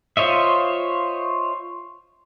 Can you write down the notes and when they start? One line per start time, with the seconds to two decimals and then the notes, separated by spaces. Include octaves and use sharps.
0.17 F4 C5 C#5 D#5 E5